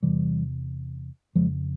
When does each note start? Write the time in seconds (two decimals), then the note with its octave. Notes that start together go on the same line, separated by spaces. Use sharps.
0.03 E2 C3 E3 G3
1.35 F2 C#3 F3 G#3